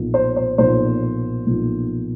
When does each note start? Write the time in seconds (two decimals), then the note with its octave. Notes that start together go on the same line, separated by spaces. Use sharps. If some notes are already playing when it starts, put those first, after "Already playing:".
Already playing: B1 A#2 F3
0.14 C5
0.36 C5
0.58 B1 A#2 F3 C5
1.47 B1 A#2 F3